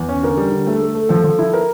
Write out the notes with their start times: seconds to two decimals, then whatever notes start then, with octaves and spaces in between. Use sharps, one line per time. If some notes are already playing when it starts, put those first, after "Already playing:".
Already playing: E2
0.09 C#4
0.23 D3 A#4
0.37 G3
0.52 D3
0.66 A3 A4
0.81 A3
0.95 A3
1.09 F3 A4
1.24 F3
1.39 E4
1.53 A#4